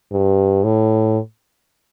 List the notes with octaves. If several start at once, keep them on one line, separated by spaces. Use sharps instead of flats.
G2
A2